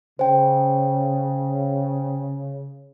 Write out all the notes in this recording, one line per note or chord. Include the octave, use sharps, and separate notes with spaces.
C#3 C5 G5